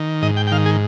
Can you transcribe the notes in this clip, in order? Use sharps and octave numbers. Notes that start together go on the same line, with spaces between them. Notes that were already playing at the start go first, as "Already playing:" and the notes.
Already playing: D#3
G#2 D#5
G5
G5
D#3 F5
G#4